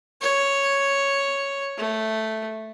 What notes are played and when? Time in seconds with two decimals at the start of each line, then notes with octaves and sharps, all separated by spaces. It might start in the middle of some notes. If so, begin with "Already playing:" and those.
0.22 C#5
1.78 A3